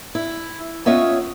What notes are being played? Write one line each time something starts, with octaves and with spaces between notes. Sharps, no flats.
E4
B3 C#4 F4 C#5 D#5 E5